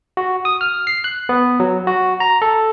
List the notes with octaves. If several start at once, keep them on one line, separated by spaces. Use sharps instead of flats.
F#4
D#6
F6
C7
F#6
B3
F#3
F#4
A#5
A4